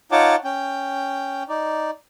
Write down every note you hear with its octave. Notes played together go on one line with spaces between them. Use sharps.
D#4 F4 C#5 F#5 A5 D6
C#4 G5
D#4 D5